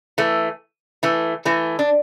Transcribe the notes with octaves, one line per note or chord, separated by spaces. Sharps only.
E3 A3
E3 A3
E3 A3
D4